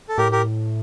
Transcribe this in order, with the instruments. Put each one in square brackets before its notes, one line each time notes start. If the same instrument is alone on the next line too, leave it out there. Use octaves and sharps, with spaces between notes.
[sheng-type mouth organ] A4
[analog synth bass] A2 [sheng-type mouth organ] G4 A#4
[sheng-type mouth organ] G4 A#4